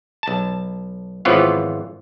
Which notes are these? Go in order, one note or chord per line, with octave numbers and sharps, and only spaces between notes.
B1 A5
G#1 E3 F3 B3 F4 C#5